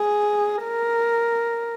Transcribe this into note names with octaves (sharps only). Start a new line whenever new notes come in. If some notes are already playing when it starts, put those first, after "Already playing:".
Already playing: G#4
A#4